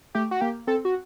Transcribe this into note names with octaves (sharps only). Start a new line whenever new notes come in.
A3 G4
F#4
A#3 G4
C4 A4
F#4